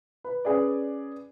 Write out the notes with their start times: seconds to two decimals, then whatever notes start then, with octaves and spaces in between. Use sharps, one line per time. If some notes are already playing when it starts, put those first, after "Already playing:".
0.24 B4
0.45 C#4 G#4 B4 D5